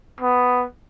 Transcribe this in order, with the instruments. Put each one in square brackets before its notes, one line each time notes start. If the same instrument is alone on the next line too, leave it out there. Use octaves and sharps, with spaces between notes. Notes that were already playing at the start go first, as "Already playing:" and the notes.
[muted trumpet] B3